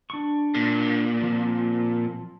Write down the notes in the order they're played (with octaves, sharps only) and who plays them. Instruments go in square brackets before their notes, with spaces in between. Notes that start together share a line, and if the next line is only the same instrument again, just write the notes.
[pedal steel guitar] D4 C#6
[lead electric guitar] A#2
[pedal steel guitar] F3 C4